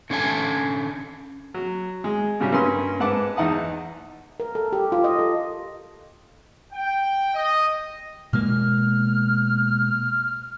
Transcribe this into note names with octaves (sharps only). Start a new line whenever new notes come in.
D3 C#4 A4 F5 G#5 A5
F#3
G#3
A2 C#3 F#3 G3 C#4
G2 A#3 C#4 C6
G#2 B4 F#5 A5 D6
E2 D#4 F#5 A5 D#6
A#4
A4
G4
F4
D#5
A4
G5
D#5
B2 G#3 A#3 F6